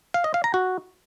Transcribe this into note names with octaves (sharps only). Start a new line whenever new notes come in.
F5
D#5
F5
A#5
F#4